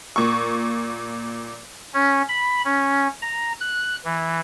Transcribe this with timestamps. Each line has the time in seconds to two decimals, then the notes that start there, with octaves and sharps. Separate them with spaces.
0.16 A#2 C#6
1.94 C#4
2.29 B5
2.65 C#4
3.22 A#5
3.60 F#6
4.05 E3